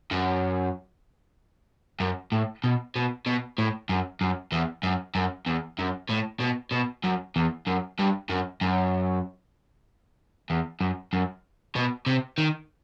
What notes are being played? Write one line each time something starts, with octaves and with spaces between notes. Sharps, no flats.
F#2
F#2
A2
B2
B2
B2
A2
F#2
F#2
E2
F#2
F#2
E2
F#2
A2
B2
B2
F#2
E2
F#2
G2
F#2
F#2
E2
F#2
F#2
B2
C3
D#3